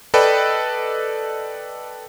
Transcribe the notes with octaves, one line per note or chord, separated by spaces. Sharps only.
A4 B4 D5 D#5 G5 B5